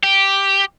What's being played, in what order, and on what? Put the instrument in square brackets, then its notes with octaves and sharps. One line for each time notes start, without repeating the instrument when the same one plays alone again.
[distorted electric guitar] G4